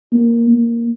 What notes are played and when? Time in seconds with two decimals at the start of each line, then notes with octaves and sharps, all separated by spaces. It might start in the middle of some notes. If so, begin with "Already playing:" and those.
0.12 A#3
0.51 A#3